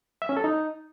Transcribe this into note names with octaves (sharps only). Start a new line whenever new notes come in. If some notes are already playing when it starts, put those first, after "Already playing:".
E5
C#4
A4
D#4